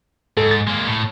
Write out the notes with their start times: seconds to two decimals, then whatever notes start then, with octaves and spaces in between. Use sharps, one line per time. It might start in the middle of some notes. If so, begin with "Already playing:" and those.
0.37 G#2 A4
0.51 A6
0.67 G#3 A#3
0.87 A2